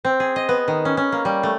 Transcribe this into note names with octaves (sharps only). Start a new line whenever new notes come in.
C4
G#4
D#5
B3
D#3
C#4
C#4
A#3
G3
A3